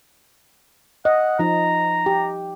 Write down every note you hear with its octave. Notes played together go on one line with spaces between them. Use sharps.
D#5 F#5
F3 D#4 A#5
G4